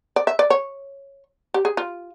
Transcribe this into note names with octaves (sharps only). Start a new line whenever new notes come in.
D5
E5
D5
C#5
G4
G#4
F4